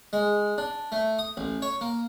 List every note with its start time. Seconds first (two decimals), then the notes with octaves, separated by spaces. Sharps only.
0.13 G#3
0.58 D4
0.92 A3
1.19 D#6
1.37 A1
1.62 C#5
1.81 A#3